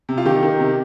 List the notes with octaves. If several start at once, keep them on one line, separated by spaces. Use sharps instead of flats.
C3
F4
D#3 G4
D#3
C3